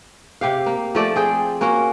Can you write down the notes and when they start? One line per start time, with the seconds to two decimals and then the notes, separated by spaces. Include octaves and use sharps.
0.41 C3 G4 F5
0.66 A#3
0.95 F3 A3 D5
1.16 C4 G#4 G5
1.61 A#3 C#4 F#4 A#4